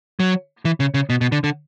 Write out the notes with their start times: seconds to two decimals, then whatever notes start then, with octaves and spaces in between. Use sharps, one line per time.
0.20 F#3
0.65 E3
0.80 C#3
0.94 C#3
1.10 B2
1.21 B2
1.32 D3
1.44 D3